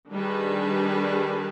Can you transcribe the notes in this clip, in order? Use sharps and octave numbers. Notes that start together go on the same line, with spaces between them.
D#3 G3 D4 G#4 B4